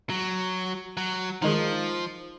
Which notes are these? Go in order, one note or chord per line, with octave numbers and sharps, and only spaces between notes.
F#3
F#3
D#3 F3 G#3 D#4